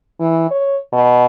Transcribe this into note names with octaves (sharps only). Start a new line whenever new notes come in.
E3
C#5
B2